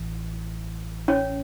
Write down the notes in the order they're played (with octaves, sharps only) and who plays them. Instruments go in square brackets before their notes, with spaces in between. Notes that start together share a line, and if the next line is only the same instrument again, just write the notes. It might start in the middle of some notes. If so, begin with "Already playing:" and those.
Already playing: [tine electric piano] A1 A2 E3
[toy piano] C#4 C#5